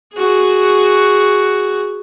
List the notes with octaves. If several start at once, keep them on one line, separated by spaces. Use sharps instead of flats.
F#4 G#4